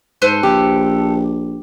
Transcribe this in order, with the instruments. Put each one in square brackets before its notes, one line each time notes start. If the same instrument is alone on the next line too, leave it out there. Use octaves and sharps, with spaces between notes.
[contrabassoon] G#2 [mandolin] A4 B4 C5
[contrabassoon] A#1 [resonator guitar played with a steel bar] G4